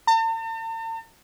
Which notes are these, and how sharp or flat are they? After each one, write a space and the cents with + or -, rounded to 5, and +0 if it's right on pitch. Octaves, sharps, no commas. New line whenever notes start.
A5 +45